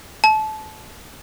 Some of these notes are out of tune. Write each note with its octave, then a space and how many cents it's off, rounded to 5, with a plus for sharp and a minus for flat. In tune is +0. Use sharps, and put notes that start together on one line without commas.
A5 -25